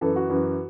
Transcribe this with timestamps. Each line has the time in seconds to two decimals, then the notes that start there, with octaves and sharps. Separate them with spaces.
0.01 F#2 E3 A4
0.16 F#4
0.29 F#2 E3